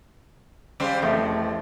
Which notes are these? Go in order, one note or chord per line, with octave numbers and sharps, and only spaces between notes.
C#3 G3 C5
F1 E2 A3